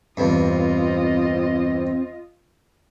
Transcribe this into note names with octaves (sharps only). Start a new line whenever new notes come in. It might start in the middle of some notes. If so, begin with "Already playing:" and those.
E2 G2 C4 F4 D#5